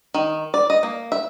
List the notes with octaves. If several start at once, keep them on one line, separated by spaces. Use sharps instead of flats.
D#3
D5
D#5
A#3
E5